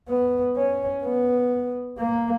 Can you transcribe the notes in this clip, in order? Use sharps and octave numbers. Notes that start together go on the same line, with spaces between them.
B3
C#4
B3
A#3